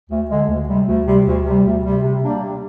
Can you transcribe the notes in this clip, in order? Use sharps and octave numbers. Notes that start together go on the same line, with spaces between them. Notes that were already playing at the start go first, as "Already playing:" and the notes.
D2
D3 G#3
D2
C3 G3
D2
C3 G3
D2
C3 G3
D2
C3 G3
C3
G3 A#3 D4
C3